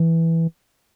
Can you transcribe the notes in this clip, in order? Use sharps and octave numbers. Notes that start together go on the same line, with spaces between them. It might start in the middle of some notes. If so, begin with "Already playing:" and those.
Already playing: E3